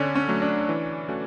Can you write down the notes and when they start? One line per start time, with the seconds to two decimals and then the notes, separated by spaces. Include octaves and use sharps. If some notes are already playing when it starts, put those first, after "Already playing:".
Already playing: D3 C#4 D4
0.15 C#4
0.28 F#3 A3
0.42 D4
0.69 E3
1.09 A3 C#4 F#4